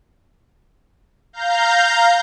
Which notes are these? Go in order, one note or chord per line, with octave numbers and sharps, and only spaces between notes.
F5 A#5 G6